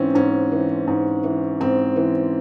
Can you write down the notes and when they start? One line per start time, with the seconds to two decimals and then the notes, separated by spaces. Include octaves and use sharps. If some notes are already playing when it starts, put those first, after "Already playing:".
Already playing: G#2 E3 C4 C#4
0.15 G#2 C#4
0.52 E3
0.88 G#2
1.24 E3
1.61 G#2 C4
1.96 E3